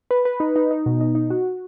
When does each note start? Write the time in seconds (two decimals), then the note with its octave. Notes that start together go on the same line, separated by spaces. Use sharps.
0.11 B4
0.25 B4
0.40 D#4
0.56 D#4
0.71 D#4
0.86 B2
1.00 D#4
1.15 D#4
1.30 F#4